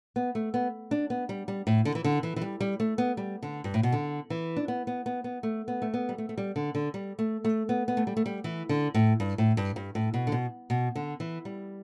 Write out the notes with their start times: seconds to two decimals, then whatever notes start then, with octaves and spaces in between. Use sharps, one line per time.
0.16 B3
0.35 A3
0.54 B3
0.91 D4
1.10 B3
1.29 G3
1.48 G3
1.67 A2
1.85 D3
1.95 E3
2.04 D3
2.23 E3
2.36 E3
2.42 G3
2.60 G3
2.80 A3
2.98 B3
3.17 G3
3.43 D3
3.64 G2
3.74 A2
3.83 B2
3.92 D3
4.30 E3
4.57 D4
4.68 B3
4.87 B3
5.06 B3
5.24 B3
5.43 A3
5.68 B3
5.82 A3
5.94 B3
6.09 G3
6.18 A3
6.29 A3
6.38 G3
6.56 D3
6.75 D3
6.94 G3
7.19 A3
7.45 A3
7.69 B3
7.88 B3
7.97 A3
8.07 G3
8.17 A3
8.26 G3
8.44 E3
8.69 D3
8.94 A2
9.20 G2
9.38 A2
9.57 G2
9.76 G2
9.95 A2
10.14 B2
10.27 D3
10.32 B2
10.70 B2
10.95 D3
11.20 E3
11.45 G3